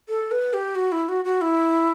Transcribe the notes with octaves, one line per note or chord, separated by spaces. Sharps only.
A4
B4
G4
F#4
E4
F#4
F#4
E4